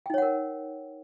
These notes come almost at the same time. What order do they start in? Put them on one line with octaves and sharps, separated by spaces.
G5 D#4 C#5 F#5 A#4